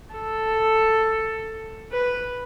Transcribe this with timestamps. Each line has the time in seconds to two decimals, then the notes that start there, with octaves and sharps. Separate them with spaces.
0.15 A4
1.92 B4